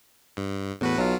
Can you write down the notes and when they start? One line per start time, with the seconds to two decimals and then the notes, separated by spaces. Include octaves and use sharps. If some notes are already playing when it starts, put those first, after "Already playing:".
0.37 G2
0.81 E2 A2 F#4 B4
0.98 B1 F#3 F4